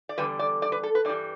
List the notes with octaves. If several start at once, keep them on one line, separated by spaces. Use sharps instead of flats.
D5
E2 D3 G3 B4
D5
D5
B4
A4
B4
G2 E3 G3 D5